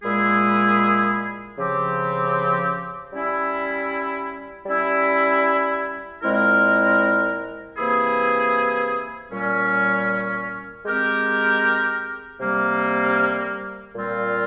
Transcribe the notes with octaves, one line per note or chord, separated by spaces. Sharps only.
A#2 G#3 E4 G#4
C#3 F3 C4 G4
G3 C#4 E4
G3 C#4 E4
A#2 G#3 C4 E4 A#4
C3 E3 A#3 E4 G#4
A#2 G3 C#4
G#3 C4 G4 A#4
C3 G3 A#3
A#2 G3 C4 F4